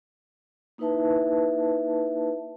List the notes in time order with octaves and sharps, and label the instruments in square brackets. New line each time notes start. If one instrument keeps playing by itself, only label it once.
[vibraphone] A#3 D#4 E4 B4 E5 A5